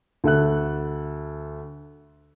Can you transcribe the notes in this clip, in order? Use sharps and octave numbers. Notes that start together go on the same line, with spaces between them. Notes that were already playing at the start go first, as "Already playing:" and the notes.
D2 A4 E5 F#6